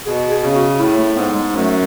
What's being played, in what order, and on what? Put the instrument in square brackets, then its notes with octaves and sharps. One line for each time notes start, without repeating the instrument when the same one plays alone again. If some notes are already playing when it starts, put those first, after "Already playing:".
[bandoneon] B2 [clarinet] G#4
[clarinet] G#4
[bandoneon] C#3
[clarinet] F#4
[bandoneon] A2 [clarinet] E4
[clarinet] A3
[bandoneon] G#2 [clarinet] B3
[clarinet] G#3
[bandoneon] F#2 [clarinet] A3